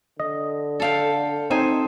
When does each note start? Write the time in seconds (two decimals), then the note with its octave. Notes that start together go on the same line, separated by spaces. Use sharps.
0.20 D3 D#5
0.80 A4 F5 G5
1.50 C4 D#4 A4 C5 G#5